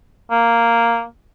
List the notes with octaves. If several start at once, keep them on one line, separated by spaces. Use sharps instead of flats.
A#3